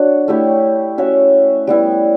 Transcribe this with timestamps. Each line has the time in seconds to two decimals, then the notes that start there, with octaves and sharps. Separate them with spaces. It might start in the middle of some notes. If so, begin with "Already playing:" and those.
Already playing: D4 F#4 C#5
0.28 A3 E4 G4 C#5
0.98 C#4 F#4 C#5 E5
1.67 G3 B3 E4